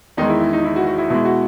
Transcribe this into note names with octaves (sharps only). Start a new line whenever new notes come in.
E2 D#3 G#3 D#4
E4
E4
D#4
E4
F#4
F#4
E4
B2 G#3 E4
F#4